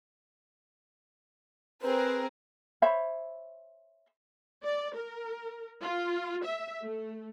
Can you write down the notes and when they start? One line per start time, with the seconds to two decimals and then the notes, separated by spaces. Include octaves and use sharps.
1.82 C4 G#4 A#4 B4
2.82 C5 C#5 E5 B5
4.63 D5
4.95 A#4
5.80 F4
6.44 E5
6.83 A3